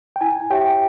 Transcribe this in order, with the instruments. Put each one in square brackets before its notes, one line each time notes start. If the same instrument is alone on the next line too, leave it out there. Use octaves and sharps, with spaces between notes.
[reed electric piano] G5
[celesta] E4 [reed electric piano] G#5
[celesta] G4 C#5 E5 [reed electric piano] G5